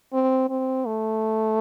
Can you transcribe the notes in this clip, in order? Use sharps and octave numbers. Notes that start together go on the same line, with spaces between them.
C4
C4
A3